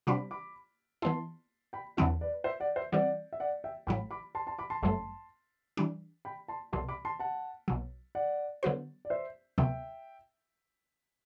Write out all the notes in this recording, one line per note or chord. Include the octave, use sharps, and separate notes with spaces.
C3 G3 D4 F#4 C5 B5 D6
B5 D6
E3 B3 E4 A5 C6
G5 B5
E2 D3 F#3 C4 E4 F#5 A5
B4 D5
C5 E5
D5 F#5
C5 E5
E3 G3 C4 D5 F#5
E5
D5 F#5
E5 G5
A1 A2 F#3 G5 B5
B5 D6
A5 C6
A5 C6
B5 D6
A5 C6
G1 F#2 F#3 A3 A5 C6
E3 G3 D4
G5 B5
A5 C6
C2 B2 F#3 A5 C6
B5 D6
A5 C6
F#5 A5
B1 B2 F#3
D5 F#5
D3 F#3 B3 F#4 C5
D5
C5 E5
D2 C3 F#3 B3 E5 G5